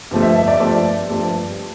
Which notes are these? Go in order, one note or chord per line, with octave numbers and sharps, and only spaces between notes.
G2 F3 A3
E5
E5
D5
G2 F3 A3 D5
G2 F3 A3